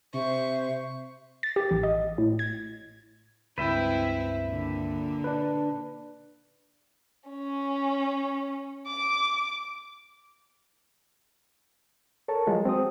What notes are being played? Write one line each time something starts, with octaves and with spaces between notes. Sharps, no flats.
C3 C5 E5 C#6
A6
G4
A1
D#5
A2
G#6
C#2 G2 C4 E4 B4 E5 G5
A#2 D3
D4 B4
C#4
D6
A4 A#4 C#5 A5
F3 F#3 G#3 F4
C4 F#4 D#6